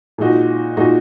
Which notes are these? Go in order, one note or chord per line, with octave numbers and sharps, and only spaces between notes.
A#2 G#3 D#4 F#4
A#2 G#3 D#4 F#4